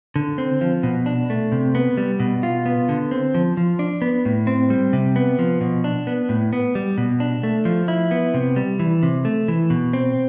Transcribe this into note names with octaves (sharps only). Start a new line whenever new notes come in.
D3
C4
F3
B2
D4
A3
C3
B3
G3
B2
F4
B3
D3
C4
F3
F3
D4
B3
A2
C4
G3
C3
B3
F3
B2
D4
B3
A2
B3
G3
B2
D4
A3
F3
E4
B3
C3
G3
E3
C3
A3
E3
B2
C4